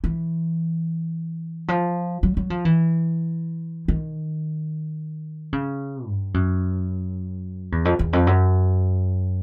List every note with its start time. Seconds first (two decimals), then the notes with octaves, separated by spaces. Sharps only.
0.04 E3
1.68 F3
2.23 F#3
2.37 F#3
2.50 F3
2.65 E3
3.88 D#3
5.53 C#3
6.07 G2
6.34 F#2
7.72 E2
7.85 F2
7.99 E2
8.13 F2
8.27 F#2